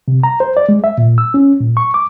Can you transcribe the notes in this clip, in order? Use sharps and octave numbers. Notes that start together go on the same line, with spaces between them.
C3
A#5
C5
D5
G#3
E5
A#2
E6
C#4
A#2
C#6
D6